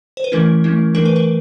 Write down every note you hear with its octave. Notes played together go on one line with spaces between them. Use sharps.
C5
B4
E3 A3 C#4 E4 A#4
E3 A3 C#4 E4
E3 A3 D4 A#4
B4
A#4